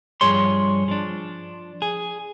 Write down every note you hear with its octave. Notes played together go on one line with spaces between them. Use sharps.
G2 F3 G#4 C#5 C6
F3 D4
G#4